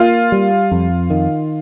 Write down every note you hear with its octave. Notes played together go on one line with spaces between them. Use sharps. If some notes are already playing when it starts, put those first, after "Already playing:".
Already playing: A#3 F4
G3
F2
D#3